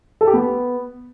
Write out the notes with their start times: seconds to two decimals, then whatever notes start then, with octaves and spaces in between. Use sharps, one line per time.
0.21 A4
0.27 G4
0.34 B3